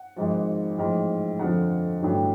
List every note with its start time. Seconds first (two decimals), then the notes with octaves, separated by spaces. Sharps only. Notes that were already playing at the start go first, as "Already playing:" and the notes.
Already playing: F#5
0.16 G#1 G#2 F3
0.78 A1 G#2 F3
1.39 F2 D3 F3 F#5
2.01 A1 G2 D3 F#3